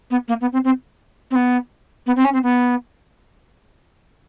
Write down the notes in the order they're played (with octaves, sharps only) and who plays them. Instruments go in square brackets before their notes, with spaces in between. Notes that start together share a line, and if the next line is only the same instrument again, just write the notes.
[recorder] B3
A#3
B3
C4
C4
C4
B3
B3
C4
C#4
C4
B3